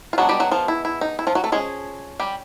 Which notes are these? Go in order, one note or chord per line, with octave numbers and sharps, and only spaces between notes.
F4
F#3 G#3 B3 D4 F#4
G3 G4
F#3 F#4
F3 F4
E4
E4
D#4
E4
F3 F4
F#3 F#4
A3 A4
F3 G#3 C#4 G#4
G3 G4